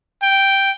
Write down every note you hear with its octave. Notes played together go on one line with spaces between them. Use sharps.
G5